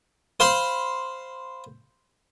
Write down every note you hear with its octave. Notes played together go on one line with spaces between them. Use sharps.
C5 F5 B5 C6